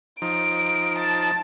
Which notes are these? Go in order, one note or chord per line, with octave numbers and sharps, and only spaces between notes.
F3 D#4 D7
A5